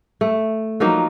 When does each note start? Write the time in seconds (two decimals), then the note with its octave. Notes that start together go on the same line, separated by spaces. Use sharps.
0.21 A3
0.80 F3 F#3 A#3 D#4